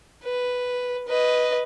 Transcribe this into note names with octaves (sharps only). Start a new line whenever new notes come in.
B4
B4 D#5